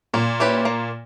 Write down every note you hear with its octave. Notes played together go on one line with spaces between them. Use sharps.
A#2 A#3
C#4 E4 G4 B4
A#3